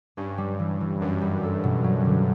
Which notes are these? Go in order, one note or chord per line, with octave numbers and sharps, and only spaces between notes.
G2 C#4
G3
E3
E3
F#2 D4
G3
A4
B2
F#3
D3